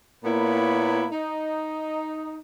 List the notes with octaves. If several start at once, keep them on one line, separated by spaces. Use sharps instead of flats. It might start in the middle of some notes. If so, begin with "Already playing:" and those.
A#2 A#3 B3 E4 C#5 B5
D#4